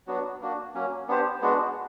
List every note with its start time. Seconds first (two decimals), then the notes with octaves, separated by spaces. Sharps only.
0.07 F#3 B3 D4 F#4
0.41 A#3 D4 F#4
0.74 F#3 A#3 C#4
1.08 B3 D4 G4 C5
1.41 G#3 B3 D4 F#4